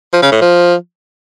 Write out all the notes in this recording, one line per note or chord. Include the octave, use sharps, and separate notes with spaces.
F3
C#3
A2
F3